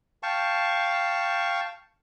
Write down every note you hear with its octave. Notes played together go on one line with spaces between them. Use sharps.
F5 G5 A5 C#6